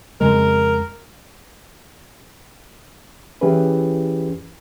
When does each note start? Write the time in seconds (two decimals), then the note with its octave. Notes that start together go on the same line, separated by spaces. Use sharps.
0.21 F2 C#3 G#3 A#4
3.41 E3 C#4 E4 G4 G#4 B4